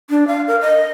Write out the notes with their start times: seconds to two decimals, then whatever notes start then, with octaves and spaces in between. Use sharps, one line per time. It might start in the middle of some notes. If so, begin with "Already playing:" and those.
0.10 D4
0.27 F5
0.48 A#4
0.61 D#5